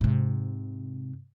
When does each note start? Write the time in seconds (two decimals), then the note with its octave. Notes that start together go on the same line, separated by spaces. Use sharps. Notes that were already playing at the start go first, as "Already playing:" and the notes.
0.01 G#2 C3